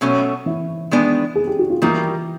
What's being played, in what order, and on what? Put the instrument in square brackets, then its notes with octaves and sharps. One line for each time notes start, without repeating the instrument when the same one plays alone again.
[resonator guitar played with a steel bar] B2 F#3 A3 C#4
[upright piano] E3 E4
[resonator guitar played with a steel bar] D#3 G#3 B3 D4
[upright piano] G#4
G4
F#4
F4
[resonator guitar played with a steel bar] D#3 G3 A#3 [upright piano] E3 E4